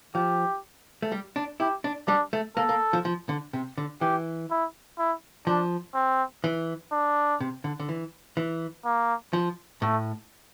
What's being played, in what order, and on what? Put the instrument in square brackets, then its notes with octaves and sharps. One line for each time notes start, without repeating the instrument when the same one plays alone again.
[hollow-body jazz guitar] F3 [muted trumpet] G4
[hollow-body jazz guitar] A3
G3
D4
[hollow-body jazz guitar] E4 [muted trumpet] G4
[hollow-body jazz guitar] D4
[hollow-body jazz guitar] G3 [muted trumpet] D4
[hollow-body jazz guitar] A3
[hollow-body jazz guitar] A#3 [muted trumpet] A4
[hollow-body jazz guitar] A#3
F3
F3
D3
C3
D3
[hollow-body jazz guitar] E3 [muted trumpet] G4
[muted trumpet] E4
E4
[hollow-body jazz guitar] F3 [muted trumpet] D4
[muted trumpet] C4
[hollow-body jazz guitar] E3
[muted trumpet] D4
[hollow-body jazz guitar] C3
D3
D3
E3
E3
[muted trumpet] A#3
[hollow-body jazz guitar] F3
[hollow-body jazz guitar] A2 [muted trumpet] A3